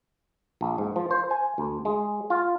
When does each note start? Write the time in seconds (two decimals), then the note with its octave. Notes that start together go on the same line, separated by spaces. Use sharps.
0.61 A#1
0.78 G#2
0.96 F3
1.11 C5
1.31 G#5
1.58 D2
1.85 G#3
2.30 F4